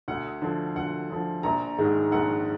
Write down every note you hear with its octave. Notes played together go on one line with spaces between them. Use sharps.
D2 F#5
D3 F3
D2 F#5
D3 F3
A#1 A#5
G#2 D#3 G#3
A#1 F#5